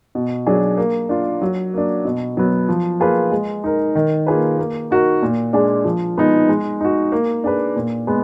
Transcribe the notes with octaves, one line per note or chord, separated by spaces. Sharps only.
B2
F#3 D4 G#4
A#3
D4 F4
F#3
A#3 D4
B2
F#3 B3
F3
A#3 F4 G#4 B4
G#3
D#4 A#4
D#3
A#3 F4 G#4 B4
A#3
D#4 F#4 A#4
A#2
G#3 D4 G#4
F3
G#3 B3 D#4
G#3
D#4 F#4
A#3
D4 G#4 B4
A#2
G#3 B3